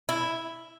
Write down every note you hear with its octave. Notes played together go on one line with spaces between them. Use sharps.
E4